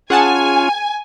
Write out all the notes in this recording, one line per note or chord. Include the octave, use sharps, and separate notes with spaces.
C#4 F4 G#4 F#5 G#5 A5